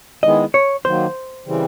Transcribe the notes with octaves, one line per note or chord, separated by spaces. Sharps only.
D#3 G#3 B3 E4 G#4 D#5
C#5
D#3 F#3 A#3 C5
C#3 E3 G3 C4